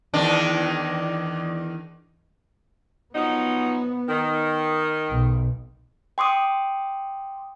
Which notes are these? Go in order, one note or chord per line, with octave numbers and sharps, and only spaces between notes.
E2 D#3 D4
F3 F#3 B3 D#4
D#3
B1
G5 C6 D6 D#6